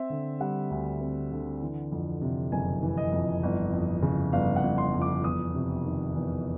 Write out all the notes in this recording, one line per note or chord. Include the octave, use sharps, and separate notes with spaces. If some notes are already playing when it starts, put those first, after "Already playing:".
Already playing: C4 E5
D3
G3 F#5
D2
C4
D3
E3
F2
C3
F#1 G#5
E3
D#5
F2
G1
F2
C#3
G1 F5
F#5
G1
C6
F2
D6
E2 D#6
C3
D#3
E2